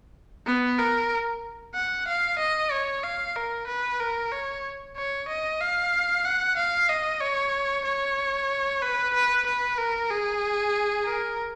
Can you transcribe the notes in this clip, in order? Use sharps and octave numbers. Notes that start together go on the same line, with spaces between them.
B3
A#4
F#5
F5
D#5
C#5
F5
A#4
B4
A#4
C#5
C#5
D#5
F5
F#5
F5
D#5
C#5
C#5
B4
B4
B4
A#4
G#4
A#4